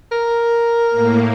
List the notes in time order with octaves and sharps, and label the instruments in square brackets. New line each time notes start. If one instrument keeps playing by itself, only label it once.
[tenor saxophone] A#4
[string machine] A2 A#3